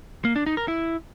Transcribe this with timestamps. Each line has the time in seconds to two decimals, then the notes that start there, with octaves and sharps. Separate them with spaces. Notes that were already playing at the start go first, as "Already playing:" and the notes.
0.25 A#3
0.36 D4
0.46 D#4
0.57 A#4
0.68 E4